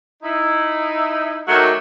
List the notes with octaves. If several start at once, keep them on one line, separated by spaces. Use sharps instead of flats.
D#4 E4
D#3 F#3 A3 A#3 F#4 E5